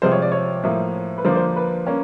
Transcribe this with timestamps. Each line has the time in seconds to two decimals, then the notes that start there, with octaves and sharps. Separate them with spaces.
0.02 C3 F3 G#3 C5
0.12 C#5
0.22 D5
0.32 C#5
0.63 A2 F3 A#3
1.18 B4
1.25 D3 F3 A#3 D4 C5
1.35 C5
1.56 B4
1.87 A#3 C#4